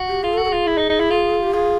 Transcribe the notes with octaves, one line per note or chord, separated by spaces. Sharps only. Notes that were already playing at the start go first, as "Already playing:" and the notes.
Already playing: F#4
G4
F4 G#4
F#4 A4
A4
F4 G#4
E4
D#4
D#4
E4
F4
G4
F4 G#4